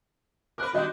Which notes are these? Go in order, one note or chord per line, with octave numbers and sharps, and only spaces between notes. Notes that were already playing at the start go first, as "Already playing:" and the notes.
A#4 B4 D6 F#6
D#3 G3 D#4 F#4 D#5